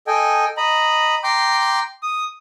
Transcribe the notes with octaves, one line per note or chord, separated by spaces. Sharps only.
A4 D#5 G5 G#5
D#5 A#5 B5
G5 A#5 C6 D6 G6
D#6